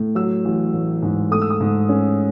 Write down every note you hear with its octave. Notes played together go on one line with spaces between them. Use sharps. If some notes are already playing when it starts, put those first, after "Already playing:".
Already playing: A2
F#3 E6
A1
A1
G#2
A3 D#6
E6
D#6
G#2
C#4